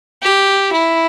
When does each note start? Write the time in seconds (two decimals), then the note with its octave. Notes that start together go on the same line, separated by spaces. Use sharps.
0.22 G4
0.72 E4